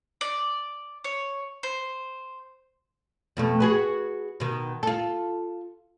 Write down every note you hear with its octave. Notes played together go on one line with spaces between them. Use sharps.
D5
C#5
C5
F2 B2 A3
F#4 G#4 B4
B2 D#3
F4 A4